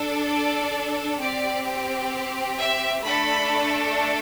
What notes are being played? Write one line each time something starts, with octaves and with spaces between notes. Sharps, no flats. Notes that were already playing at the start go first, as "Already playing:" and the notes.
Already playing: D4 A4
D5
C4 G4 D5
E5
A3 D4 A4 B5